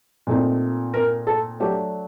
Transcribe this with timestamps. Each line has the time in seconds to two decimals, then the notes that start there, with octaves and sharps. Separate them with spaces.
0.27 A#2 A3 C4 D#4
0.94 A#4
1.27 A4
1.60 F#3 A3 D4 G4